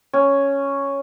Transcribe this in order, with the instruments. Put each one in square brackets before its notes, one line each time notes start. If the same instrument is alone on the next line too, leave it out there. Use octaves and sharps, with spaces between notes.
[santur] C#4